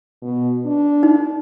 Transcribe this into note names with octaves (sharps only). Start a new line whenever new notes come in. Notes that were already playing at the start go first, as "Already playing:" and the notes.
B2
D4
D#4